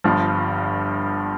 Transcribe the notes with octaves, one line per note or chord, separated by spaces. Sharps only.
G1 G2 F3